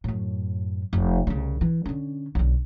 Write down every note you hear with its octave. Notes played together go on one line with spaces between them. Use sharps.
F#2 A2
F1
C2 C#3
E3
D3 C#4
B1 D3